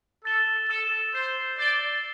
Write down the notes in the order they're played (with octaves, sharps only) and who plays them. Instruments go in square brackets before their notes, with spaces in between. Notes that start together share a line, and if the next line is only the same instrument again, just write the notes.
[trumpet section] A4 [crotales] E6 A6 E7 G7
[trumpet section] A4 [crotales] E6 A6 E7 G7
[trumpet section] C5 [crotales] G6 C7 E7 G7
[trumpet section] D5 [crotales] G6 C7 E7 G7